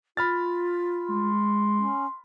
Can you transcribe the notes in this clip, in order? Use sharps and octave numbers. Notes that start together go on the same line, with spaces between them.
F4 B5 F6 A6
G#3 C6
C#4